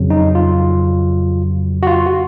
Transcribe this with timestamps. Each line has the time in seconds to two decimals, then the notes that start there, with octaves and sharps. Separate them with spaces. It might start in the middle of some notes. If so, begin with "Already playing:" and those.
Already playing: F2 C#3 F#3
0.10 D#4
0.35 F4
1.83 F#4
1.87 F4
2.06 F#4